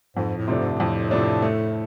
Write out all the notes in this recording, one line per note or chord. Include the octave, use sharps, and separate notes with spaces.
F2 G#2
A2
C3 F3 A3 D4
G#2
G#2
F2 A2
C3 F3 A3 D4
A3